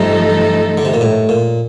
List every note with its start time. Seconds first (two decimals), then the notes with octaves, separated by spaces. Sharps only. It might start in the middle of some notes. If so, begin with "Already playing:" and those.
Already playing: G2 C3 F3 A3 D#4 A4
0.78 D3
0.85 C3
0.94 A#2
1.01 A2
1.29 A#2